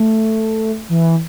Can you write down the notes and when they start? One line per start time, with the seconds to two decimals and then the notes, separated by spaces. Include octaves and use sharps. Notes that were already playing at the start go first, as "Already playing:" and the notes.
Already playing: A3
0.89 E3